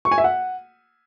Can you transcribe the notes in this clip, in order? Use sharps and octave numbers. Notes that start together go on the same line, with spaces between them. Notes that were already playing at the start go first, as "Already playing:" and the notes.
C#6
G#5
E5
F#5